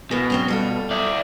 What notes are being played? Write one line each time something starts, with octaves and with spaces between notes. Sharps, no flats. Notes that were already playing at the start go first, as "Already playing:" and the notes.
B2 E3 A#3
F#3 C4 C#4
G3 F4 A4
E4 D5